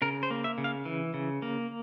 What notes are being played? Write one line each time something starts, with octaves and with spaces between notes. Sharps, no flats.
C#3 A#4
C5
A#3
E5
C#3
F5
E3
C#3
A#3